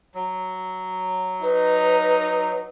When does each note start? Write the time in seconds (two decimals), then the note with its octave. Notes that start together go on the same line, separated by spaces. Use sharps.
0.15 F#3
1.43 D#4 B4